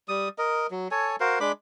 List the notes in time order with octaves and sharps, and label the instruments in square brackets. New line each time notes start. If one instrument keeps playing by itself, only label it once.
[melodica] G3 D#6
A#4 D#5
F#3
A4 C#5 G#5
F#4 A#4 C5 F5
G#3 D4 B5 D6